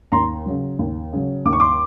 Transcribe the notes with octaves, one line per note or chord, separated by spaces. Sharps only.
D#2 A#5 C6
C#3 F#3
D#2
C#3 F#3
D#2 D6
C#6
C6 D6